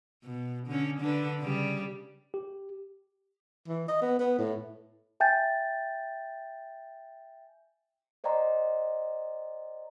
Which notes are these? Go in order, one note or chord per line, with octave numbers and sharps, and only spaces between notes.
B2
D3 C#4
D3 D4 B4
C#3 G3
G4
E3
D#5
B3
B3
A2
E5 G5 G#5 G6 A6
C5 D5 D#5 G5 A#5 C6